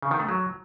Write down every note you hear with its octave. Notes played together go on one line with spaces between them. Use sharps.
C#3
D#3
A3
F#3